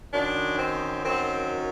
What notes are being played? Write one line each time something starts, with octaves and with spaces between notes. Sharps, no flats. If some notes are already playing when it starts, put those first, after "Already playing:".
F#2 D#3 F#3 D4
C4
F#2 D#3 F#3 C4